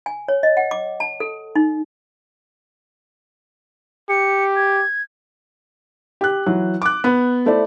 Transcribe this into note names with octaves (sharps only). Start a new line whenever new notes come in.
G#5
C#5
D#5
F#5
D6
A5
A4
D#4
G4 C#7
G#6
G4 F#6
E3 F#3
D6 F#6
B3
A3 E4 C5 D5